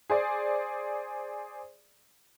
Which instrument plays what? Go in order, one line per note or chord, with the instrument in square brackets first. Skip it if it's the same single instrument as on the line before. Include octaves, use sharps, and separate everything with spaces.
[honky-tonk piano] G#4 C5 D5